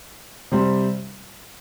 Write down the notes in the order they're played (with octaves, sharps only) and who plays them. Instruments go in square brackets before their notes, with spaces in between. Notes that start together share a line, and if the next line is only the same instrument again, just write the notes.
[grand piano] C3 G3 C4